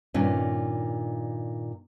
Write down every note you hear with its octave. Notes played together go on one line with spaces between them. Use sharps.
G2 A#2 D#3 C#4